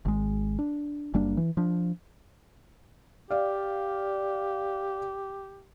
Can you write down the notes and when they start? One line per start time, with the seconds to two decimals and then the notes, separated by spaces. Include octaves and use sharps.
0.05 G#1 G#3
0.59 D4
1.14 F#1 G3 A#3 D4
1.37 E3
1.57 F3 D4
3.30 G4 D5 F5